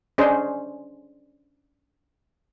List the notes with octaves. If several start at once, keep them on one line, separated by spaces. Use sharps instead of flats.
C#4 D4 G#4 C5 D#5